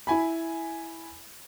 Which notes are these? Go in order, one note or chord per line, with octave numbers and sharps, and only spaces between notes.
E4 G#5 B5